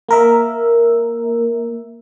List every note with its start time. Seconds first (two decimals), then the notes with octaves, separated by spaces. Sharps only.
0.09 A#3 A#4 E5